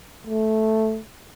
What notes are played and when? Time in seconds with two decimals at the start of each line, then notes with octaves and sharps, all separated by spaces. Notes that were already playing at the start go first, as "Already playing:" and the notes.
0.27 A3